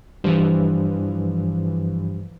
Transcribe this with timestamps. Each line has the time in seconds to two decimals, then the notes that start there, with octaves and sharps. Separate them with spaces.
0.24 G2 E3 F3 G3